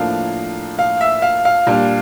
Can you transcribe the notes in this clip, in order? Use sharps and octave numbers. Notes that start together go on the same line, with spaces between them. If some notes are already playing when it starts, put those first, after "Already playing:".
Already playing: A2 F3 A#3 D4 F5
F5
E5
F5
F5
A#2 G3 D4